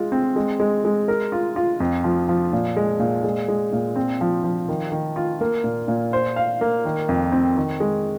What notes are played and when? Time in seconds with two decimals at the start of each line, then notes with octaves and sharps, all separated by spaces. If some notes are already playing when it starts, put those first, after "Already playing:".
Already playing: G#3 F4
0.12 C4
0.36 G#3
0.60 G#3
0.85 G#3
1.08 A#4
1.32 F4
1.56 F4
1.80 F2
2.04 F3
2.29 F3
2.53 A#2
2.77 G#3
3.00 A#2
3.24 G#3
3.48 G#3
3.73 A#2
3.96 C4
4.21 F3
4.44 F3
4.69 D#3
4.92 D#3
5.16 F4
5.41 A#3
5.64 A#2
5.88 A#2
6.13 C5
6.36 F5
6.61 A#3
6.85 D#3
7.09 F2
7.32 C4
7.57 D#3
7.80 G#3